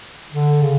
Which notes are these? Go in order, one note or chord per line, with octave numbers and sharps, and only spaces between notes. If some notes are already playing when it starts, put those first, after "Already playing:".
D3
C#3